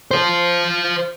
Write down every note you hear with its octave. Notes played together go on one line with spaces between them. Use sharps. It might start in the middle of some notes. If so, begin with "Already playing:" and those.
F4 C5